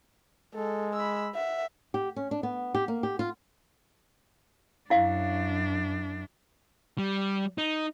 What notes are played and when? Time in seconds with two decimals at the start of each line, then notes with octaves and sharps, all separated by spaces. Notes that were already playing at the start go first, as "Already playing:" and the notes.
0.55 G#3 A4
0.96 B5 E6
1.35 E5 F#5
1.94 G4
2.16 C#4
2.31 D4
2.43 B3
2.75 G4
2.88 A#3
3.03 G4
3.19 F4
4.90 F#2 D4 E4 F5
6.98 G3
7.58 D#4